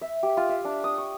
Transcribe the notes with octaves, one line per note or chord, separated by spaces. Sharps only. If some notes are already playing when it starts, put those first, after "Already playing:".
E5
G4
F4
E5
D4
D#6
C#6